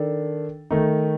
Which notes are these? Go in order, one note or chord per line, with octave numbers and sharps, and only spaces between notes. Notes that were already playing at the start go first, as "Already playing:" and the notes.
Already playing: D#3 D4 A4
D#3 A3 D#4